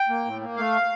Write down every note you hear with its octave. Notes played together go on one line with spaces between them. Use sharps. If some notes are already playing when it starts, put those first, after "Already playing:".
Already playing: G5
A#3
A2
A#3
A3 F5